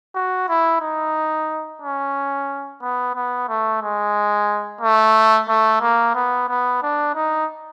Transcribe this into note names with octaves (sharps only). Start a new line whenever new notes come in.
F#4
E4
D#4
C#4
B3
B3
A3
G#3
A3
A3
A#3
B3
B3
D4
D#4